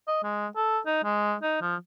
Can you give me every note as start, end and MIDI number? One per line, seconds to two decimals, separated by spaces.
0.08 0.22 75
0.23 0.47 56
0.56 0.79 69
0.86 1.00 63
1.04 1.35 56
1.42 1.56 63
1.61 1.76 53